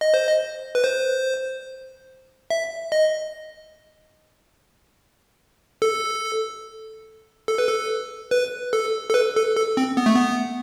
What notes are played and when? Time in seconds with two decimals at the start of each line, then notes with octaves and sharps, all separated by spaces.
0.01 D#5
0.14 C5
0.27 D#5
0.75 B4
0.84 C5
2.50 E5
2.92 D#5
5.82 A4
7.48 A4
7.58 B4
7.68 A4
8.31 B4
8.73 A4
9.10 A4
9.14 B4
9.36 A4
9.56 A4
9.77 C4
9.97 B3
10.06 A3
10.15 B3